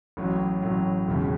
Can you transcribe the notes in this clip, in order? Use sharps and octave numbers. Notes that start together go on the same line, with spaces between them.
A1 A2 F#3
A1 A2 F#3
E1 D#2 C#3